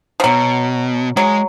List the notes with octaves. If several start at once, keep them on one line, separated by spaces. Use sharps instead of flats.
F3
B2 F#3
F#3 G#3